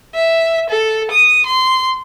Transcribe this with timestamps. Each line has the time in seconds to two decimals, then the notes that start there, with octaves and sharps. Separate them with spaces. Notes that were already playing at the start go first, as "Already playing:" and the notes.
0.15 E5
0.70 A4
1.11 D#6
1.46 C6